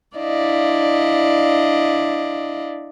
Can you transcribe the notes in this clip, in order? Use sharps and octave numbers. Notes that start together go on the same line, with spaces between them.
D4 E4 D5 D#5 F5